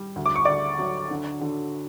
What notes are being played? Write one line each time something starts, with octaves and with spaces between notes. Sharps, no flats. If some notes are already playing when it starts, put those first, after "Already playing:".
Already playing: G3
D2
D6
C#6
D5 D6
D2
F#3
D3
D3